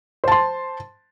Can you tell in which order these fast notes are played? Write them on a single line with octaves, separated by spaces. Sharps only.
C5 A5 C6